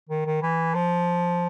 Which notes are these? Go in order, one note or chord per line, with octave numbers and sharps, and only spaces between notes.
D#3
D#3
E3
F3